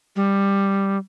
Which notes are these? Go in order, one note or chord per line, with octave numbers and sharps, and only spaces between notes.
G3